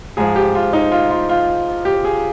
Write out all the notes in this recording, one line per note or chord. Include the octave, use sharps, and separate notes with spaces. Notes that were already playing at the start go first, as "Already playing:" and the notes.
G#2 F3 G#4
G4
F4
D#4
F4
F4
F4
G4
G#4